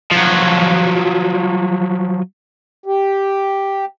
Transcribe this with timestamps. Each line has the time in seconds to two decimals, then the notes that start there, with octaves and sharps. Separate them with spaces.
0.11 F3 F#3
2.86 G4